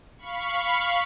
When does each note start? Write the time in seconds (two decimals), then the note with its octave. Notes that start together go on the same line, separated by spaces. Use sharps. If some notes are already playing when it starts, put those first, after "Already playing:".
0.17 F5 B5 C#6